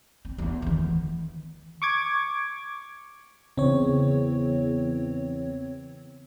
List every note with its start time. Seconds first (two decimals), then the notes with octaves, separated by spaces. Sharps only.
0.25 C4
0.38 E2 B3
0.62 D#3 E3
1.82 C#6 D6 G#6
3.58 E2 C#3 C4 C#5